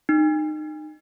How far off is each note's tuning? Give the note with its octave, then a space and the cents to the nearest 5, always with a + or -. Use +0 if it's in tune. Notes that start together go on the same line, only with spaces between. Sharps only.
D#4 -25